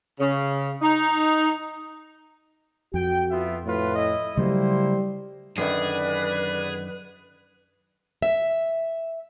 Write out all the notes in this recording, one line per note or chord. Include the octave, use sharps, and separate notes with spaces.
C#3
D#4
F2 F#4 G5
B3 F4 E5
A2 F4 B4
E4 D#5
C#3 F#3 G3 A3 A#3 E4 C5
F#2 D3 D#3 G#4 B4 D5
E5